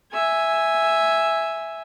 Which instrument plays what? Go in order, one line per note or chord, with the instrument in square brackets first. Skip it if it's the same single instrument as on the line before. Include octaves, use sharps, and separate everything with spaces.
[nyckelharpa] E5 G#5